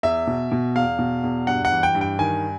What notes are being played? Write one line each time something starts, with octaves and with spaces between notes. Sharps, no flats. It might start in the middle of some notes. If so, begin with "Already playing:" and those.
E2 E5
B2
B2
E2 F5
B2
E2
G2 F#5
F#5
E3
G5
G2
G5
D#3 G#5